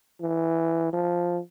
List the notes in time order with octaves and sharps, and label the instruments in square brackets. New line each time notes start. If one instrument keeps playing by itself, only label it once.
[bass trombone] E3
F3